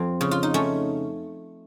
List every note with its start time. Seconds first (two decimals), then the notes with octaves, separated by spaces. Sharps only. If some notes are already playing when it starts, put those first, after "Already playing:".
Already playing: F2 C4
0.21 C#3
0.31 F4
0.43 D#4
0.54 A3 C#4